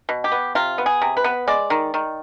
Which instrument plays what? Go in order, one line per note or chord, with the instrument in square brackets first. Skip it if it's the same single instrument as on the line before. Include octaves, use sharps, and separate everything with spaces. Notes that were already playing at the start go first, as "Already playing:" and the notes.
[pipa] B2
G4
B3
C3 F4
B3
G#4
C3
B4
B3
G#3 D5
D#3
D#3